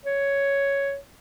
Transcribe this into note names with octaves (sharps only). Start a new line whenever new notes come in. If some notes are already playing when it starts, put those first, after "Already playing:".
C#5